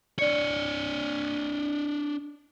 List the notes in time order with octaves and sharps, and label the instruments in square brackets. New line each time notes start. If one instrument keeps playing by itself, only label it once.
[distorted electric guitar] D4 C#5 [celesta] D5 C#7